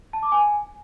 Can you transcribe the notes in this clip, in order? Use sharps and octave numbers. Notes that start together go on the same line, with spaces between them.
A5
D6
G#5